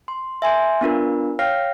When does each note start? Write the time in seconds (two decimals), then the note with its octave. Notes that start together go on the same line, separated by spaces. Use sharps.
0.08 C6
0.42 E5 G#5 C6 G6
0.81 B3 D4 F4 A#4
1.39 C#5 F5 G5 F6 A#6 C7